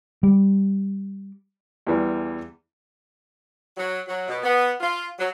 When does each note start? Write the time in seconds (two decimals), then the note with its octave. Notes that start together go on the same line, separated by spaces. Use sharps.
0.23 G3
1.87 E2 E3 G3
3.77 F#3
4.07 F#3
4.28 B2
4.43 B3
4.80 F4
5.18 F#3